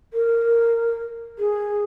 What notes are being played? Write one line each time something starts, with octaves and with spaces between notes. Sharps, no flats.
A#4
G#4